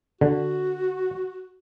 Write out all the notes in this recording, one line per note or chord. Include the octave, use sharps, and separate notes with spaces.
D3 F#4